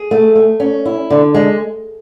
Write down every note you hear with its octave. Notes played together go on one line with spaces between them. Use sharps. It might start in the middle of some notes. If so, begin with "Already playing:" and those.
Already playing: G#4
A3
A3
C#4
E4
D3
G#3